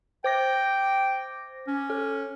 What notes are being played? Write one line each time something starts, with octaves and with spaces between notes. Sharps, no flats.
C5 G5 D6 A#6
C#4
A4